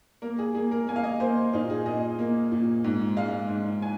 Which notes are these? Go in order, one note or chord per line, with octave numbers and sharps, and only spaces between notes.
A#3 A#4
G#4
A#3 G#4
A#4
A#3 G#5
F5
D#5
A#3 C5
A#2 D#4
G#4
A#2 D#5
A#3
A#2
G#2
G#3 F5
G#2
G#5